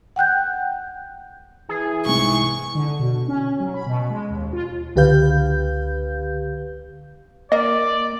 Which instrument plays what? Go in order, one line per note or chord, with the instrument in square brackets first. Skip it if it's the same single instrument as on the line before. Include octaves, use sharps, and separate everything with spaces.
[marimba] F#5 G5 F#6 G6
[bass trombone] E3 [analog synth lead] G#4
[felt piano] C2 G#2 [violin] C#6
[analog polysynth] D3
B2
C#4
F#3
B5
B2
G#3
D#2
F4
[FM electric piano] C#2 D3 G4 B4 F5 G6
[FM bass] A#3 [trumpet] D5 [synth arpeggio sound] D#5